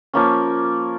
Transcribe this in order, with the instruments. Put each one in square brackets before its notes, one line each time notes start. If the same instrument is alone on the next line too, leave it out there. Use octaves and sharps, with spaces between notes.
[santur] F3 A#3 C#4